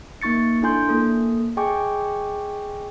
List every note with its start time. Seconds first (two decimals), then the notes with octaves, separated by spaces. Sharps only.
0.22 A#3 D#4 C#6 A6 C#7
0.62 D4 E4 A4 G#5 C6 G6
0.89 A#3 A4
1.57 G#4 D#5 G5 G#5 C#6 D6